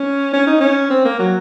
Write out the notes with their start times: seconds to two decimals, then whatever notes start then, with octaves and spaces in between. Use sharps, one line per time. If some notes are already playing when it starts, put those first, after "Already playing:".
Already playing: C#4
0.33 C#4
0.47 D#4
0.61 C#4
0.90 C4
1.05 A#3
1.19 F#3